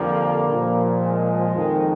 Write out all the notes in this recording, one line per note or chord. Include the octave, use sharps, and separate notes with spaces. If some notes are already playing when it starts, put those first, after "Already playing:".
Already playing: F2 D3 F3 G3 A#3
A#2 F3
G#3
F2 D#3